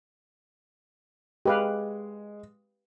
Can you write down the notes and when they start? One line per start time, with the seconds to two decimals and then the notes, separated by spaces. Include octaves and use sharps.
1.46 G#3 G4 B4 F5